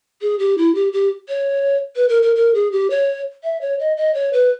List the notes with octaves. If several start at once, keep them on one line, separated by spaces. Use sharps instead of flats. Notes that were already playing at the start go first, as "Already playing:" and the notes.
G#4
G4
E4
G4
G4
C#5
B4
A#4
A#4
A#4
G#4
G4
C#5
E5
C#5
D#5
D#5
C#5
B4